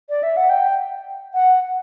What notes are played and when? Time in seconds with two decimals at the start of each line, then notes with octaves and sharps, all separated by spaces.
0.09 D5
0.23 E5
0.37 F#5
0.50 G5
1.34 F#5